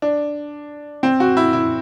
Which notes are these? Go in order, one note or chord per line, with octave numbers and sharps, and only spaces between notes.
D4
C4
F#4
E4
E4